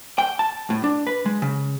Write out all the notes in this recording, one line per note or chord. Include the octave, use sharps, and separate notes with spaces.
G5
A5
A2
D4
B4
G#3
C#3